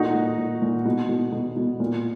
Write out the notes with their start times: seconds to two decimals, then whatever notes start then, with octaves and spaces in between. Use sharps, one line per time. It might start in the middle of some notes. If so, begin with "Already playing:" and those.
Already playing: A#2 D#4 F#4
0.14 A#2
0.38 A#2
0.62 A#2
0.85 B2
1.09 B2
1.32 B2
1.57 B2
1.80 A#2